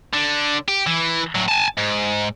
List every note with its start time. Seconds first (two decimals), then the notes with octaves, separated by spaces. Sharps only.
0.14 D3
0.68 G4
0.87 E3
1.35 A2 F#3
1.48 G#5 A5
1.78 G#2